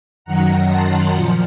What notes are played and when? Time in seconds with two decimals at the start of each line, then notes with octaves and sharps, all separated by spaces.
0.25 F#2 D#3 F#3 F#5 A#5
0.70 A5 C6
1.15 A#2 F3